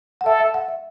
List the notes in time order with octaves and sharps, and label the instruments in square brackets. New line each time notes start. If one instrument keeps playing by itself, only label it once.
[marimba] F#5
[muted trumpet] A4 [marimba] E5
[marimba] E5
F#5
E5